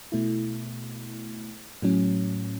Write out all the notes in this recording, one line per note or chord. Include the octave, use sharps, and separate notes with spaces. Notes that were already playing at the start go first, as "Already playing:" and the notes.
B2 A3 E4
A2 F#3 C#4